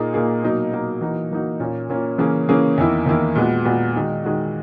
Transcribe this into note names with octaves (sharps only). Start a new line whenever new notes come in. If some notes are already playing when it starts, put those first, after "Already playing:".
Already playing: A#2 A#3 D#4 G#4
A#2 A#3 D#4 G#4
B2 F#3 A#3 D#4
B2 F#3 A#3 D#4
E3 A#3 D#4 F#4
E3 A#3 D#4 F#4
A#2 A#3 C#4
A#2 A#3 C#4
C#3 E3 A#3 C#4 G#4
C#3 E3 A#3 C#4 G#4
E2 D#3 A#3 E4
E2 D#3 A#3 E4
A#2 G#3 B3 F#4
A#2 G#3 B3 F#4
D#3 G#3 D#4 F#4
D#3 G#3 D#4 F#4